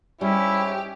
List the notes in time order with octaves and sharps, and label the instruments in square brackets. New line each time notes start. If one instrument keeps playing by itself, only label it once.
[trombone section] G#2 C#4 [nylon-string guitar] G3 [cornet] E4 [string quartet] G4